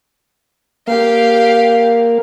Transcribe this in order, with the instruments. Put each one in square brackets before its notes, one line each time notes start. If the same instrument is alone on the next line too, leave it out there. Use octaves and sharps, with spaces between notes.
[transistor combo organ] A#3 [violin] G4 F5